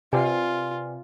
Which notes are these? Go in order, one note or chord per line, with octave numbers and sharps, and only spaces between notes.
C3 F4 B4 D5 G#5